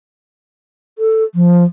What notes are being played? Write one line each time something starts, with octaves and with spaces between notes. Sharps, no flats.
A4
F3